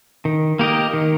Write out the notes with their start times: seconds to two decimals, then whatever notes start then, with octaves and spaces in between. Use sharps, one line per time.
0.25 D#3
0.59 A#3 G4 A#4 D#5
0.93 D#3